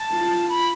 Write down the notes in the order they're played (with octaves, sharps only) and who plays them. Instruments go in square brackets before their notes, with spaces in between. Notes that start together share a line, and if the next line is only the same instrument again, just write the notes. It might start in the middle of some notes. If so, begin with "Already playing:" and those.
Already playing: [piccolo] A5
[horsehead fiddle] F4
[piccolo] B5